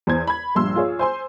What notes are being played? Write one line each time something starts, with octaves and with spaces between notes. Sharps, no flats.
E2 C5 G#6
B5 G#6
A#1 G2 C6 E6
F4 G#4 C#5
C5 G#5 C6